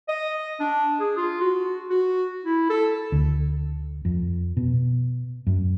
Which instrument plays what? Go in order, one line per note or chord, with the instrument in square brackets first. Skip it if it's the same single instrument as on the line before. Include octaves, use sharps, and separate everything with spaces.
[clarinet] D#5
D4
G#4
F4
F#4
F#4
E4
A4
[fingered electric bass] D2
F2
B2
F#2